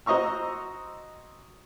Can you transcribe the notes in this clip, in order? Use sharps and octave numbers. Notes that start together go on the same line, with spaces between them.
F#4 C5 D#5 A#5 C#6 E6